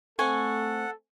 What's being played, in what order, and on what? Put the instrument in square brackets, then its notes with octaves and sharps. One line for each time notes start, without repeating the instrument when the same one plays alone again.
[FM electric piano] A3 C4 [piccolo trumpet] A4 [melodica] F#5 [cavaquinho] G#5 C#6